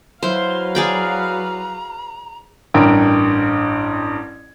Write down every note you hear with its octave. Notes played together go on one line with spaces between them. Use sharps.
F#3 E4 F#4 B4 C5 F5 C6
G#4 D5 G5 A#5
A1 G2 A#4 G5